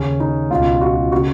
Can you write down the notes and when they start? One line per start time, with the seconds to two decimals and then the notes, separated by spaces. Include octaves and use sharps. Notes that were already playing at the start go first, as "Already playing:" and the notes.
Already playing: D#2 C#3 C#4
0.20 D#4
0.50 C#2 B2 F4
0.81 F#4
1.12 C#3 F#4